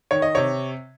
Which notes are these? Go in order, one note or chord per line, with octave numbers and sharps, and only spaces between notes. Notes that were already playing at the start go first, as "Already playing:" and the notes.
D#3 C#5
D#5
C3 C#5